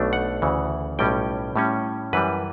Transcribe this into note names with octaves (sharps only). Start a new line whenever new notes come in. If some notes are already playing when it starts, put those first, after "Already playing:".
Already playing: B1 B2 A3 D4
F#5
D2 C#3 E3
B1 A2 G3 C#4 G5
A2 G3 C#4
F#2 E3 G3 B4